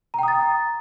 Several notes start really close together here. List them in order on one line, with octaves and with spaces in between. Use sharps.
A#5 G5 D#6 A6